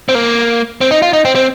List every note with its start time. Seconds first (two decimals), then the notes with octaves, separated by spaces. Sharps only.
0.09 C4
0.15 A#3
0.81 C4
0.91 D#4
1.02 F4
1.13 D#4
1.25 C4
1.35 C4